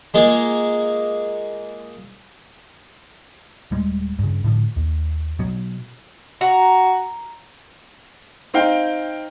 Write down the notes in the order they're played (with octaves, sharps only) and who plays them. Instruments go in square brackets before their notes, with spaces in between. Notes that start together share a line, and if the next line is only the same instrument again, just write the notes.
[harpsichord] G#3 A#3 F4 G#4
[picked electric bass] D#1 G3 G#3
G2 C#3
A2 D3 F3
D#2
B2 F#3
[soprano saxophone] F#4 [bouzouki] A#5
[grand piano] C4 D#4 F5 G5